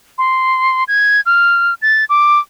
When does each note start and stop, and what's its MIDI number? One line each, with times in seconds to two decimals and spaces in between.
0.18 0.84 84
0.88 1.21 92
1.26 1.74 89
1.82 2.05 93
2.09 2.39 86